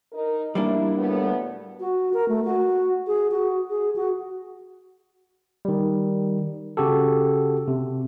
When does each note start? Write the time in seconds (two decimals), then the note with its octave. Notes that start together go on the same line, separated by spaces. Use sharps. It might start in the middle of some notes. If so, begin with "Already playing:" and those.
0.12 D#4 A#4
0.55 G3 A#3 D4 E4
0.98 D2 A2 B3
1.80 F#4
2.14 A#4
2.28 A3
2.44 F#4
3.07 G#4
3.31 F#4
3.70 G#4
3.96 F#4
5.65 D#3 G3
6.77 C#3 F#4 G4 A4
7.68 C3